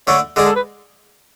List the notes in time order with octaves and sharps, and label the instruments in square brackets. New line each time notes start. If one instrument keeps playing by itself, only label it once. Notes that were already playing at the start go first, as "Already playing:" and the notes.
[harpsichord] D3 A3 D4 [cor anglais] C#5
[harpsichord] D3 G#3 D4 G#4
[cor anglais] A4
B4